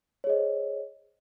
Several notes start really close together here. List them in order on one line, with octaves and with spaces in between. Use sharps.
C#5 G#4 D#5 C5